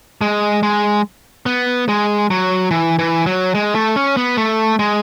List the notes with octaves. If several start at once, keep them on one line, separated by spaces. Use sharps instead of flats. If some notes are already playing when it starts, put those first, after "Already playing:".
G#3
G#3
B3
G#3
F#3
E3
E3
F#3
G#3
A3
C#4
B3
A3
G#3